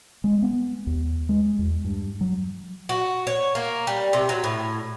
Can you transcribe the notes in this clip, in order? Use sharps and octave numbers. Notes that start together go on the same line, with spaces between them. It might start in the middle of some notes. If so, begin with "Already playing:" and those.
G#3
B3
D#2
G#3
E2
G2
F#3
F#4
C#5
A#3
G3
C3
F#3
A2